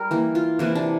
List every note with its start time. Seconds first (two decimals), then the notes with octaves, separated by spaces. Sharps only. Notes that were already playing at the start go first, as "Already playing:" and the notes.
Already playing: G3 A#4 D5
0.11 E3 A#3
0.35 F4
0.59 C3 E3 A#3 E4
0.75 D4